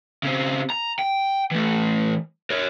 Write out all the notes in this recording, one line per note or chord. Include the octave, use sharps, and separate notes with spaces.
C#3 C4
A#5
G5
E3 A3
A#4 C#5